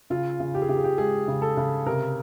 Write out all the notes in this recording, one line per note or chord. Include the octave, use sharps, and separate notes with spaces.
C#3 F4
C#3
G4
G#4
C#3 G4
G#4
G4
G#3 G#4
C#3
A4
C#3
C3 A#4